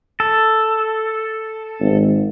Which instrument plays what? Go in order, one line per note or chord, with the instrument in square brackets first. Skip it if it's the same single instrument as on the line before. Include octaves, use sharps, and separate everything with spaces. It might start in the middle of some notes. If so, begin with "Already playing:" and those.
[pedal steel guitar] A4
[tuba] G#1